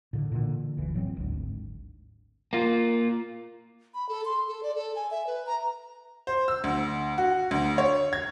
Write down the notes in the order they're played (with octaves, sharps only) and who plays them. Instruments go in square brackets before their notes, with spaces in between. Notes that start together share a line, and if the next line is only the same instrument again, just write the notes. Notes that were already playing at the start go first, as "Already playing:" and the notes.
[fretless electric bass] A2 D3
A#2 D3 E3
F#1 D2 E3
A2 F#3 G#3 C4
G#1 D2
[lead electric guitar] A#3 F4
[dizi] B5
A4
C6
A4
D5
A4
G#5
E5
B4
A#5
[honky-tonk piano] C5
E6
D2
F#4
D2
C#5
G#6